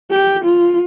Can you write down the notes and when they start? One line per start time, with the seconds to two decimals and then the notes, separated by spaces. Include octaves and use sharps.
0.11 G4
0.44 F4